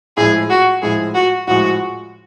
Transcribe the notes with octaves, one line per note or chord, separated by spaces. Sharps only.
A2 F3 G#3 G#4
F#4
A2 F3 G#3 G#4
F#4
A2 F3 G#3 F#4